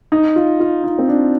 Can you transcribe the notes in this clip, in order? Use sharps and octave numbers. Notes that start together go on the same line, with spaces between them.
D#4
F4
F4
D#4
C4
D4